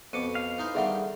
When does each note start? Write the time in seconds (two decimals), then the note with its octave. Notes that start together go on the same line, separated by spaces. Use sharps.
0.13 F2 B2 D6 C#7 D#7
0.35 F5
0.58 E3 D#4 C5
0.75 D3 D#3 G3 G#4 E5 F#5